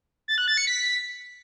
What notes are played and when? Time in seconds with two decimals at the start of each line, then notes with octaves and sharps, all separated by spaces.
0.28 A6
0.38 F#6
0.48 A6
0.57 C#7
0.67 B6